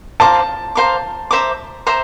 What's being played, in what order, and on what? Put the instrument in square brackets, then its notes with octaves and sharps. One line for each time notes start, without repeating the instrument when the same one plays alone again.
[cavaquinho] C5 F5 A#5 D6 [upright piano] A5
[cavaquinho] C5 F5 A#5 D6
C5 E5 A#5 D6
C5 E5 A#5 D6